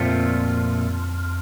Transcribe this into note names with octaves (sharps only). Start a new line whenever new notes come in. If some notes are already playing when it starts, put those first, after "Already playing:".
Already playing: F2 A#2 F3 A3 C4 F4